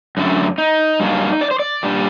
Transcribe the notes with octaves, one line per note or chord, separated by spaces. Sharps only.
F#2 D3 F#3 A3
D#4
G2 F#3 A#3 D4
D5
C5
D5
A#2 G3 D4